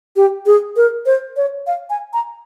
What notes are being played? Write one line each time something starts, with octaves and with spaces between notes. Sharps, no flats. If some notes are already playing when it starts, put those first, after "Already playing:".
G4
G#4
A#4
C5
C#5
F5
G#5
A#5